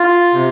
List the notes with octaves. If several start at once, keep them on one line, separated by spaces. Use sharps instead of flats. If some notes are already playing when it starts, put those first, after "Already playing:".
Already playing: F4
C3